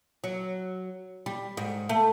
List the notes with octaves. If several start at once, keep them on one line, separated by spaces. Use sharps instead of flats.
F#3
G3
G#2
A3